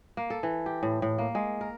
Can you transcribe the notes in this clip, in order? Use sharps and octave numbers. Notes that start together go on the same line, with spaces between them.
A#3
A4
E3
G4
A2
A2
A#3
G#3
A#4